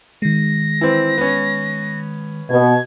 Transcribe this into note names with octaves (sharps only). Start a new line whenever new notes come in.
D#3 G#3 A#6
E3 C4
B3 C#4
B2 G#6